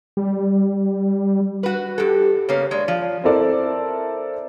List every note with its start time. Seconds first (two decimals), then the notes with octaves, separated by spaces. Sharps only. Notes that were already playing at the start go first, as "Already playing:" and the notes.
0.17 G3
1.63 F#4 B4
1.98 G2 G4 A4
2.49 C#3 A#3 B3 C#5
2.71 G2 G#3 D5
2.88 F3
3.24 C4 E4 A4 A#4 D5